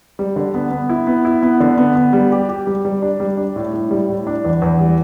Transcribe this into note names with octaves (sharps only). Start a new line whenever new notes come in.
G3
D3
B3
B3
E4
B3
E4
B3
D3
B3
B3
G3
G4
G4
G3
G3
D4
G3
D4
A2
A2
G3
A2
D4
E2
E2
G3